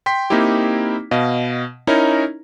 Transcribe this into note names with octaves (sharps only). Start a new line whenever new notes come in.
G5 C6 B6
A#3 C4 D#4 E4 G4
B2 D#5 F5
C#4 D#4 E4 A#4 C#5 A#5